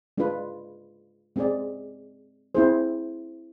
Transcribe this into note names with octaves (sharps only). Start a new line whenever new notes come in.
G#3 D4 F4 B4
G#3 C4 G#4 D5
C4 E4 G#4 C5